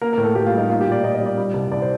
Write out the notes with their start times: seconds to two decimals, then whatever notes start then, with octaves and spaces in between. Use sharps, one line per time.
0.02 A#3 A#4
0.13 A2 A#4
0.24 A4
0.35 A2 G4
0.46 F4
0.53 G3 D#4
0.69 A#3 F4
0.81 G4
0.86 A#2
0.92 D5
1.03 A#2 D#5
1.15 D#5
1.21 G3
1.26 D5
1.37 G3
1.54 C2
1.72 C2 D5
1.82 C5